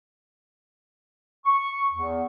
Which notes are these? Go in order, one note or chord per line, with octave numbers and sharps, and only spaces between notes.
C#6
E2